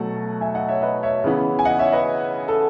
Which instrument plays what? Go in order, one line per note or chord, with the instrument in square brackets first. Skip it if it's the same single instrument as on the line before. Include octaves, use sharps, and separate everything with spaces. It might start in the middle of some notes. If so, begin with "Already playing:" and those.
Already playing: [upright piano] B2 F#3 A3 F#5 A5
E5 G#5
D#5 F#5
C#5 E5
B4 D#5
C#5 E5
C#3 E3 B3
G#5
D#5 F#5
C#5 E5
B4 D#5
A4